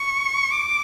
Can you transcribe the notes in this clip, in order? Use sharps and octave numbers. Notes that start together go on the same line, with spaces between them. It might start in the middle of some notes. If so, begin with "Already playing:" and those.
Already playing: C#6
D6